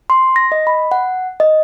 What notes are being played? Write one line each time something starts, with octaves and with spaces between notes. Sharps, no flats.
C6
A#6
D#5
B5
F#5
D#5